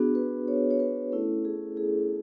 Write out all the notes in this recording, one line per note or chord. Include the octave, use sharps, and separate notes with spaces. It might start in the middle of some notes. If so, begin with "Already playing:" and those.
Already playing: B3 D4 F#4 G#4
B4
C#5
C#5
B4
A3 C#4 E4 A4
G#4
G#4